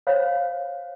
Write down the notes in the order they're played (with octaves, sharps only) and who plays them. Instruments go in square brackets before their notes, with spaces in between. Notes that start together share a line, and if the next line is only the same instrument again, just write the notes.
[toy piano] C5 C#5 F5